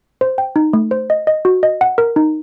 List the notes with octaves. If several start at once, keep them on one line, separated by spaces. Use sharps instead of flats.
C5
G5
D#4
A3
C5
D#5
D#5
F#4
D#5
F#5
A#4
D#4